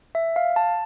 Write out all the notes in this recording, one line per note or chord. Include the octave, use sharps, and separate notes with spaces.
E5
F5
A5